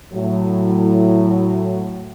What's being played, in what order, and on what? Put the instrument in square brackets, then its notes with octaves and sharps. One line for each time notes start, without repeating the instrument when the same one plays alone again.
[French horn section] A2 F#3